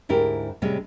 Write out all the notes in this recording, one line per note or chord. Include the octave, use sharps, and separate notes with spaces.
D2 G#2 E4 G4 A#4
A2 C3 G3 G#3 C#4